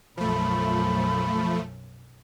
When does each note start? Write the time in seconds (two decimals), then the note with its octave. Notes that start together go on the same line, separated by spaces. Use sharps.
0.17 B1 F#2 F3 A3 B5